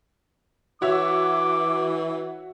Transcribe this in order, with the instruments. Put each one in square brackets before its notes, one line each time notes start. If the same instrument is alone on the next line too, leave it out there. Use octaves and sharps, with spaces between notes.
[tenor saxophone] E3 [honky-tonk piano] F#4 C#5 E5 [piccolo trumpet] D6